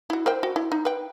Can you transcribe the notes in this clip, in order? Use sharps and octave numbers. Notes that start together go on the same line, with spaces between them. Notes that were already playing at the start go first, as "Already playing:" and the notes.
E4 F#4
A#4 C5 G5
F#4
E4
D#4
B4 G5